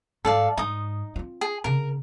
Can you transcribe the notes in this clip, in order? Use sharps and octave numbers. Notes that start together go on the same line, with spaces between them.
G#2 A4 D5 F5
G#2 D#4 D#6
C4 F4
G#4
C#3 C4 A#4